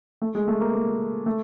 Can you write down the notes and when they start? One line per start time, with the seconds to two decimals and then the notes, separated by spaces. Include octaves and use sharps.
0.22 A3
0.35 G#3
0.48 A3
0.60 A#3
0.74 A#3
1.26 A3